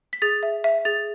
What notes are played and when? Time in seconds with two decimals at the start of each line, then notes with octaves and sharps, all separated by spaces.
0.13 B6
0.22 G#4 A6
0.43 E5
0.64 E5
0.85 G#4 A6